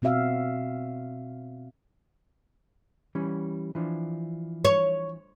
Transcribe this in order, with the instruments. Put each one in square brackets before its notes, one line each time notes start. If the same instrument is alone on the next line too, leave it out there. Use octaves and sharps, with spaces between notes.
[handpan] B2 C4 F#4 E5 F5
[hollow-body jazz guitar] E3 G3 C#4
E3 F3 D4
[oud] C#5